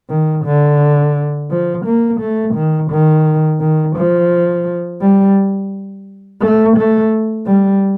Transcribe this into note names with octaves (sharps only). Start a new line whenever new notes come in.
D#3
D3
F3
A#3
A3
D#3
D#3
D#3
F3
G3
A3
A3
G3